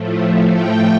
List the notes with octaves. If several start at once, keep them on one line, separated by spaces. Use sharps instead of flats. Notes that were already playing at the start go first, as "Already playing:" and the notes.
Already playing: A2 F3 A3
G5